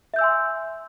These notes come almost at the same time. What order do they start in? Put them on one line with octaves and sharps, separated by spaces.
E5 G6 E6 G#5 C6